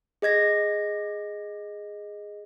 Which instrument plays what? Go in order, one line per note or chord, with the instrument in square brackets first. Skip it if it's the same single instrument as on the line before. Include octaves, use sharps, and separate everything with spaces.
[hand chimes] G#4 D#5 G#6 A#6